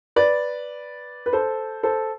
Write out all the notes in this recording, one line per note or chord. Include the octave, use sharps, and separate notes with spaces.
B4 D5
B4
A4 C5
A4 C5